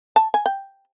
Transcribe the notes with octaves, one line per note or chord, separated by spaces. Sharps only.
A5
G#5
G5